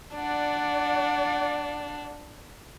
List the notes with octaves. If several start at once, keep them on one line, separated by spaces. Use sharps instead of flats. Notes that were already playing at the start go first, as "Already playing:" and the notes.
D4 D5 F#5